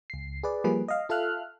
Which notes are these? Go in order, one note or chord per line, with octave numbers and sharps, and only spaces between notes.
C#2 C7
G#4 B4 D5
F3 G3 A#3 G#4 B4
D#5 F5
F4 A4 E5 F5 F6 F#6